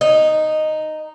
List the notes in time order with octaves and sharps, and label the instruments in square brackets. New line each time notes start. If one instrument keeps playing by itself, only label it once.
[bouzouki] D#4